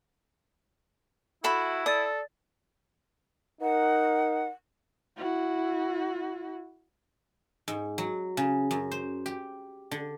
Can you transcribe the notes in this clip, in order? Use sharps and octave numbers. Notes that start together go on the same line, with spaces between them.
E4 F#4 A4 E5 B5
A4 D5 D#6 A6
D#4 A#4 F#5
E4 F#4
G#2
F#3
C#3
F#2
C5
G4
D3